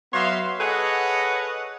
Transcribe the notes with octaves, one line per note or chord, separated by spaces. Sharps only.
F#3 B3 C#5 E5 F5 C6
G#4 A4 B4 C#5 D#5 F#5